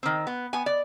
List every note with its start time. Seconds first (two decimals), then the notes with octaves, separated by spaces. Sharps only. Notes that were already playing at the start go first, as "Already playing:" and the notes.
0.03 D#3 C4
0.27 B3
0.53 B3 G#5
0.66 D5